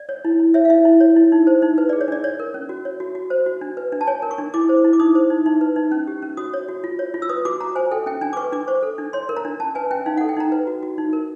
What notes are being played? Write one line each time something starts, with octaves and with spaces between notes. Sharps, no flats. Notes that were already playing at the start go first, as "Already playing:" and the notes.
Already playing: D5
C#5
E4
E4
C#5 E5
F5
E4 E5
E4
C#5
E4
D#4
C5
D#4
B4
D5
G#4
C#5
D4 D5
C#5 D5
A#4
C#4
F#4
C#5
F#4
F#4
C5
F#4
D4
B4
D4
A5
C#5 G#5
A#4
C#6
D4
E4 D6
C5
E4
D6
D#4 D#6
C5
D#4
D#4
B4
D#4
C#4
G4
C#4
F#4 D#6
C#5
F#4
F4
C#5
F4
E6
B4 D#6
F#4 D6
F#4 A#5
C5 G#5
A4 G5
C#4 G5
D4 G#5
D6
B4 C#6
D4 D6
C5 C#6
A4
D4
C#5 C6
A#4
A#5
D4
C#4 A5
B4 G#5
C#4 G5
D#4 F5
F#5
A4
G5
D#4 A#5
B4
F#4
F#4
D#4
A#4